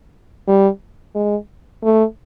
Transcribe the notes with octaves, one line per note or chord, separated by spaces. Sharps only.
G3
G#3
A3